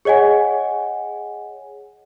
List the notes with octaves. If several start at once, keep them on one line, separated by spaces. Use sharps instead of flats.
G#4 C#5 D#5 F#5 G#5